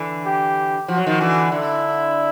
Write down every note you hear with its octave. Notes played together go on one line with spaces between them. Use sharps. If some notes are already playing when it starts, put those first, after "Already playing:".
Already playing: D3 E3
G4
F3 F#4
F#3
D#3 F3
D3 E3
D3 E4